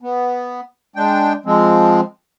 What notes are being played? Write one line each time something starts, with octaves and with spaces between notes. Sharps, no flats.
B3
G#3 D4 G5
F3 G#3 C4